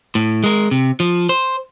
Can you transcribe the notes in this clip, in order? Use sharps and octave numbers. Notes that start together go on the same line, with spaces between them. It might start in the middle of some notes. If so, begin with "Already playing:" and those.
A2
G#3 A#4
C3
F3
C5